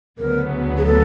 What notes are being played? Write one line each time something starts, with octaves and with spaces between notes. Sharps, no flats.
D2 C#3 F#3 B3 A#4
G#4
A4